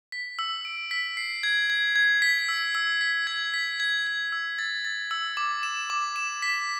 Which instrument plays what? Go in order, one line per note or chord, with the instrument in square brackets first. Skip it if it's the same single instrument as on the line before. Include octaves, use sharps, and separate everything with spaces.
[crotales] B6
E6
D7
B6
C7
G#6
G#6
G#6
B6
E6
E6
B6
G#6
B6
G#6
G#6
E6
A6
A6
E6
D6
E7
D6
E7
B6